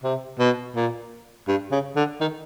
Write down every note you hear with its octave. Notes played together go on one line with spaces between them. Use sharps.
C3
B2
A#2
G2
C#3
D3
D#3